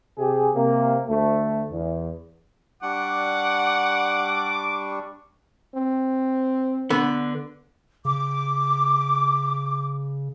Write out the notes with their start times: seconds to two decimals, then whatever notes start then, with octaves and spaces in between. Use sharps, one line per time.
0.18 C3 G4 G#4
0.54 C3 A#3
1.08 D2 A3
1.70 E2
2.83 G3 D4 F#5 C#6 D6
5.74 C4
6.90 D3 B3
8.05 C#3 D6